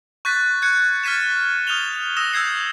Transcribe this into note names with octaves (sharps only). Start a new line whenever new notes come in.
C#6 F#6 G6 A6 B6
F#6 G#6 C#7
F6 A6 B6 D#7 E7
D#6 F6 G6 E7 F7 G7
D#6 E6 A#6 E7
E6 G6 G#6 C7 C#7